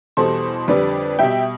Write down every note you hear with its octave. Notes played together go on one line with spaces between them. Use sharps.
E2 B2 G3 A4 C5
F2 D3 G3 B4 D5
B2 G3 E5 G5